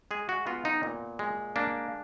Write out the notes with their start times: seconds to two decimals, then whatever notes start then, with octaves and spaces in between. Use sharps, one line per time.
0.11 G#3 G#4
0.29 F#4
0.47 B3 F4
0.65 D#4
0.83 A#2
1.19 G#3
1.56 A#3 D4